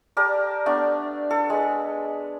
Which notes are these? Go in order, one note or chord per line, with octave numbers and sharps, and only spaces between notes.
G4 A#4 D5 A5
A3 B3 D4
A4
G#3 B4